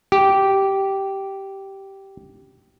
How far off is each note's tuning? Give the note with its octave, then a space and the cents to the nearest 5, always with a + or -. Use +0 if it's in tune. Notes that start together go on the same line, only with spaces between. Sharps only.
G4 -10